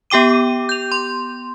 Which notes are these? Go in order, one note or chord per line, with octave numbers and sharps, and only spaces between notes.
B3 G4 G5 D6 D#7
G6 F7
C6